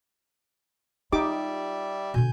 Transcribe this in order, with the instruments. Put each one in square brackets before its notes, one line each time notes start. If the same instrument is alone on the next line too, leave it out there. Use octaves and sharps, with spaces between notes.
[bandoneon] G3 D5 E5 [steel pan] D#4 G4 D6 [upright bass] F4
[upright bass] B2 D3 [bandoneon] G#5 G6